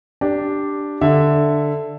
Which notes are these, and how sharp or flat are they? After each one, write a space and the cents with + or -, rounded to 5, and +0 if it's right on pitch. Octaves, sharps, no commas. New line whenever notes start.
D4 +0 G4 +0
D3 +5 E5 +0